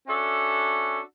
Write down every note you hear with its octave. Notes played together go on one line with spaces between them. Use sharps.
C#4 D4 F#4 A4 E5